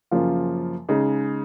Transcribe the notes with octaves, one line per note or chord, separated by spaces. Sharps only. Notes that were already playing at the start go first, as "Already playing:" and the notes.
F#2 C#3 F3 A#3 F4
C#3 G#3 D#4